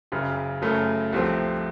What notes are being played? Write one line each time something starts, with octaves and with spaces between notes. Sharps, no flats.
F#1 F#2 C#3
F#1 F#2 C#3 F#3 A3
C2 C3 F3 A3 C4